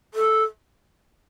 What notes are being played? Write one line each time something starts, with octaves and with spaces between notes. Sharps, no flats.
A4